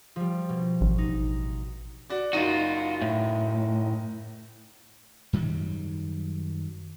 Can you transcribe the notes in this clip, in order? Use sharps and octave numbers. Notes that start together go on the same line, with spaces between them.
F3 G3
B2
A1
D#4
F#4 D5
F#1 D#4 F4 F#4 D#7
A2
F#2 D#3 F#3 G3